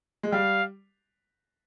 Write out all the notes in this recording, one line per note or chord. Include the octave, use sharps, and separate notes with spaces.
G#3
G3 F5